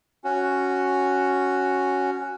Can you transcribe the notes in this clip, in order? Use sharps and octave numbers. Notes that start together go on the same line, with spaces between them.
C#4 F#4